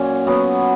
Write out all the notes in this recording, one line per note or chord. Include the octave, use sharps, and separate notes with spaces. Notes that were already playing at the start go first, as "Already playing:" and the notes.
Already playing: A#2 F#3 C#4
F#3 B3